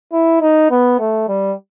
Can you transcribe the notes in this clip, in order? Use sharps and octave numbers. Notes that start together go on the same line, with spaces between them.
E4
D#4
B3
A3
G3